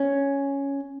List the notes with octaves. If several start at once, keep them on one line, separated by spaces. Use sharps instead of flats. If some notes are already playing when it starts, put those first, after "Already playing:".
Already playing: C#4